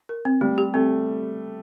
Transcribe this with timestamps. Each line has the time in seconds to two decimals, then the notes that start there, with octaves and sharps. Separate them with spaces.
0.09 A#4
0.25 C4
0.41 G3 A3
0.58 G4
0.74 A3 C4